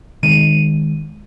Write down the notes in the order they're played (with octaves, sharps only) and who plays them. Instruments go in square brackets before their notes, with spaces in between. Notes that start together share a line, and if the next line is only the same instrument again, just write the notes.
[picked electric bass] D#3 G#3 [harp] D#7